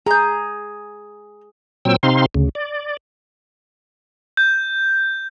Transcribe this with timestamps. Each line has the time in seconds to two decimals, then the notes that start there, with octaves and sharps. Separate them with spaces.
0.06 G#4 A#5 G6
1.85 A#2 F#3 C4 G5 E6
2.03 C3 C4 D#4 F5 C6
2.35 D2 C#3
2.55 D5
4.37 G6